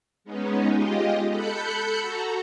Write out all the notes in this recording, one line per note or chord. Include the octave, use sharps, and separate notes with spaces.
G#3 B3 C#4 D#4
G#3 F4 G4 D#5
A4 B5 F#6 G6 C#7
F#4 A4 A#5